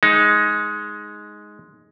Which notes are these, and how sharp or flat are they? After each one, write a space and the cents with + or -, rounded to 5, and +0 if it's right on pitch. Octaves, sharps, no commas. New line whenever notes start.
G#3 +5 D#4 +10